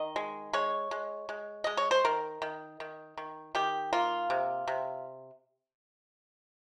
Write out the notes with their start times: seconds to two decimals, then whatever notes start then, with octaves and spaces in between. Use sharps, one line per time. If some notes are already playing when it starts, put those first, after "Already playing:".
Already playing: D#3 D#5
0.16 G#3
0.53 G#3 C#5
0.91 G#3
1.29 G#3
1.64 G#3 D#5
1.77 C#5
1.91 C5
2.05 D#3 A#4
2.42 D#3
2.80 D#3
3.17 D#3
3.55 D#3 G4
3.93 A#3 F4
4.30 C3
4.68 C3